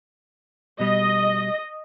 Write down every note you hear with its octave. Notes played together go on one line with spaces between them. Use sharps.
B2 G3 D#5